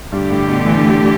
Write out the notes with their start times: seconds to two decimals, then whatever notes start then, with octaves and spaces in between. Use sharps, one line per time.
0.12 G2 D3 A3 G4
0.31 A2
0.48 B2
0.66 E3